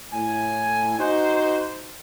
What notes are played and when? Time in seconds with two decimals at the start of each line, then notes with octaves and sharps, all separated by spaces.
0.12 A2 G#5
0.98 D#4 F#4 C5